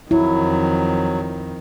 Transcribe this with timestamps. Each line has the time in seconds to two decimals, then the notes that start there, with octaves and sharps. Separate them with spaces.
0.11 F2 D#3 F#3 E4